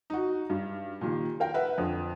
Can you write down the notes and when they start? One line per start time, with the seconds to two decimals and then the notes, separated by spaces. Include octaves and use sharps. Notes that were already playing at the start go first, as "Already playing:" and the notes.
0.10 D#4 F#4
0.50 G2
1.01 A#2 D#3 G4
1.40 A#4 F5 G5
1.54 B4 E5 F#5
1.78 F2 D3